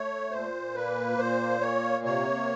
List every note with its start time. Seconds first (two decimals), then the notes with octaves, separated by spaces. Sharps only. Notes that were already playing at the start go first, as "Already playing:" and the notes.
Already playing: A3 C#5
0.31 A#2 C5
0.75 A#3 B4
1.18 A#2 C5
1.61 A#3 C#5
2.04 C3 C#5